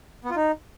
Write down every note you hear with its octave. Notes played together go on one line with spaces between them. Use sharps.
B3
F4
D#4